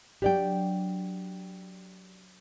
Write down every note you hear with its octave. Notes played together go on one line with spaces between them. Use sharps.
F#3 D4 G4 D5 G5